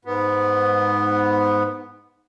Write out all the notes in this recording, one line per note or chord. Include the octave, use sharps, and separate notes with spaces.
G#2 B3